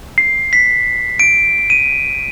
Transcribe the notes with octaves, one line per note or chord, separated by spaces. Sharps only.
C7
B6
D7
D#7